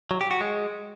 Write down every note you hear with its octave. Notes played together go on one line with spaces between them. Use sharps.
F#3
G4
F#4
G#3